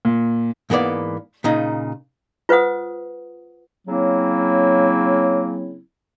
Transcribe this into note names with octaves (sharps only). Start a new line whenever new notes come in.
A#2
G#2 E3 A#3 B3 D5
A#2 C#3 D#4
F4 B4 C5 F#5 D#6
C#3 F#3 A#3 C4 E4